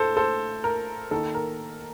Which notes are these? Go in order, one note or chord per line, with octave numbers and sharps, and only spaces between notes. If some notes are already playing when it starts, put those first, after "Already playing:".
Already playing: A2 A4 C5
A4 C5
A#4
D#3 A#3 D#4 A4
A#4